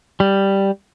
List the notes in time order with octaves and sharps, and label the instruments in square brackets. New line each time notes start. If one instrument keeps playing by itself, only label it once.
[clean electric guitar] G3